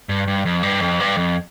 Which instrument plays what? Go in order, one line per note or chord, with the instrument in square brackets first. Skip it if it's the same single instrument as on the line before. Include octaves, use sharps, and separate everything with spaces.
[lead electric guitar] G2
G2
F2
G2
F2
G2
F2